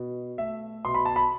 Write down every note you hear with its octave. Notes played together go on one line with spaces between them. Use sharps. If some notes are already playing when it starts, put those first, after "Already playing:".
Already playing: B2
A3 E5
B2 C6
B5
A5
B5